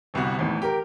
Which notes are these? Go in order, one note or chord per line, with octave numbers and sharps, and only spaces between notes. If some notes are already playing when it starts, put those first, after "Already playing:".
G1 C2 B3 F#4
G#1 E2 A2
G4 A#4